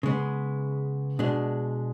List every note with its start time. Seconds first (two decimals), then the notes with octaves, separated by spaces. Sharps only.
0.03 C#3 G#3 B3
1.19 B2 G#3 D4